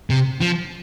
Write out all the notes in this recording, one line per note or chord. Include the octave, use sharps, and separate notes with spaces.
C3
F3